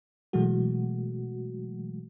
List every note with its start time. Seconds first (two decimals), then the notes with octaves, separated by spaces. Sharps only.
0.33 B2 E3 F#3 G#3 A3 F#4